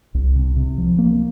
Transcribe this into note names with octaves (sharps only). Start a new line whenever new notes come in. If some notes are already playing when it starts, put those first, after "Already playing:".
C2
C3
C3
F3
A#3